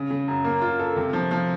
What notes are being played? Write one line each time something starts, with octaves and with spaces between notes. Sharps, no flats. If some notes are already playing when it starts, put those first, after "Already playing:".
Already playing: C#3
C#3
F#2
A#3
F4
A4
C3
F3
F3